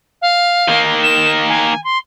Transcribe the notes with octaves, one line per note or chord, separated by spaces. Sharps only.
F5
D#3 A#3
E7
G#5
C6